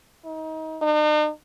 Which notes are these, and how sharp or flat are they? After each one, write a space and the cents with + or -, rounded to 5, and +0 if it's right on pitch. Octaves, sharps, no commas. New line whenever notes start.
D#4 +30
D#4 -45